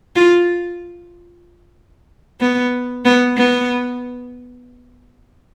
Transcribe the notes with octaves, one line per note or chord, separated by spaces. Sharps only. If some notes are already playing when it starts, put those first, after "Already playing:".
F4
B3
B3
B3